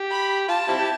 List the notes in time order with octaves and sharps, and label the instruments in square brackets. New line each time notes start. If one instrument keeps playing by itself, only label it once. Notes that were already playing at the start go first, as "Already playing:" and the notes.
Already playing: [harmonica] G4
[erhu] B5
[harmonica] F4 [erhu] A5
[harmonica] G3 C4 E4
G4